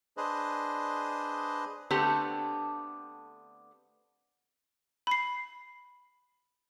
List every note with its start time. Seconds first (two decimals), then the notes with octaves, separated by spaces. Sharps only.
0.17 D4 G#4 B4 C5 D#5
1.91 D3 A3 B3 C4 D4 G4
5.07 B5 C7